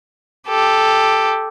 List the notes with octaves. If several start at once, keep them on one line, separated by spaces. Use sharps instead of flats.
G4 A4